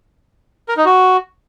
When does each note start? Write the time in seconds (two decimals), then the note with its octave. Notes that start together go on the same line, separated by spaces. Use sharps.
0.69 A#4
0.77 D#4
0.85 F#4